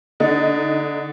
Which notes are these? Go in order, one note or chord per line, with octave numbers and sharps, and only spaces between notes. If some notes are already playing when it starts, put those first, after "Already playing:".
D3 D#4